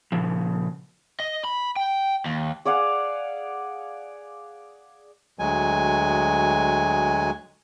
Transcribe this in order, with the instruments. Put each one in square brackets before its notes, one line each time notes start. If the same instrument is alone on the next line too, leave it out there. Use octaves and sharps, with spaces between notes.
[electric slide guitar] A#2 C#3 F3
[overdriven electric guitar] D#5
B5
G5
D#2
[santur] G#4 D5 F5 F#5
[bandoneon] D2 F#3 G#3 G#5